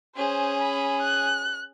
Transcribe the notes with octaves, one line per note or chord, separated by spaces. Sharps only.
C#4 G#4 C5
B5
F#6